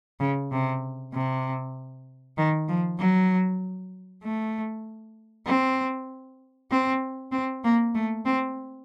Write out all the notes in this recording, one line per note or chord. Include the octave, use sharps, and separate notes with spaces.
C#3
C3
C3
D#3
F3
F#3
A3
C4
C4
C4
A#3
A3
C4